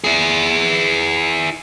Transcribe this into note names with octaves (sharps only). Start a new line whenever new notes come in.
E4 G#4